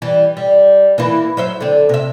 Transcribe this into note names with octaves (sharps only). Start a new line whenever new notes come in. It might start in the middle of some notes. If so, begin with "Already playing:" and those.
E3 G3
G3
E3 A#3 E4
F#3 C5 E5
D3 C4
C3 E5